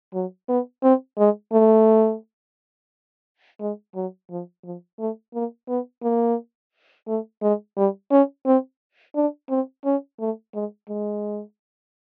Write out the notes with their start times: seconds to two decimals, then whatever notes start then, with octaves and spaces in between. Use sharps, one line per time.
0.14 F#3
0.49 B3
0.83 C4
1.18 G#3
1.53 A3
3.60 G#3
3.95 F#3
4.30 F3
4.64 F3
4.99 A3
5.34 A#3
5.69 B3
6.03 A#3
7.08 A3
7.42 G#3
7.77 G3
8.11 C#4
8.46 C4
9.16 D4
9.50 C4
9.85 C#4
10.20 A3
10.54 G#3
10.89 G#3